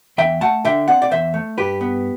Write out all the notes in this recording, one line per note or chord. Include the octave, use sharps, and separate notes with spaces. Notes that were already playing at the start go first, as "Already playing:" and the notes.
E2 E5 G5
A3 F#5 A5
D3 E5 G5
C4 D5 F#5
D5
E2 C5 E5
A3
G2 G4 B4
B3